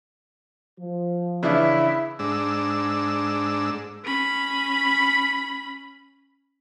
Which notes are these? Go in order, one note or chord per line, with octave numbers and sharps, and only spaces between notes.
F3
C#3 E3 D4 E4
G#2 D4 E6
C#4 B5